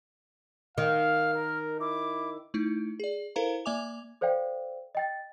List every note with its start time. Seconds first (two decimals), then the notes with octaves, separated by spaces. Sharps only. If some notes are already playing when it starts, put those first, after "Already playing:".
0.78 D#3 F5 F6
1.35 A#4
1.80 E4 D6
2.54 A3 D#4 E4
3.00 G#4 D5
3.36 E4 A4 A#4 C5 F5 A#5
3.65 A#3 D5 E5 G#5 D6 F7
4.21 A4 C5 D5 F5 G5
4.95 D#5 G5 A6